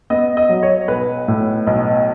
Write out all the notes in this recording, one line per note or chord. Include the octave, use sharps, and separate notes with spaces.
B3 D#5
D#5
F#3
C#5
B1 B4
A2
B1